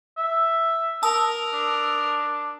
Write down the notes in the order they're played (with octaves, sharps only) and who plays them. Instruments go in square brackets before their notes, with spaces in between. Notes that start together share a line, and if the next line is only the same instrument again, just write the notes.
[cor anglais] E5
[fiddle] A#4 [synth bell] A5 D#6 E6
[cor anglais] D4